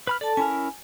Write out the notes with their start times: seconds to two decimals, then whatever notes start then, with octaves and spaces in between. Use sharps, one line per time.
0.07 B4 B5 F6
0.21 A4 D5 A5
0.37 C#4 E4 A#4 G#5